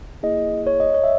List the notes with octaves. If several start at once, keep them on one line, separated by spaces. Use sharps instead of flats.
A#3 E4 G#4 D#5
C#5
D#5
C#5
E5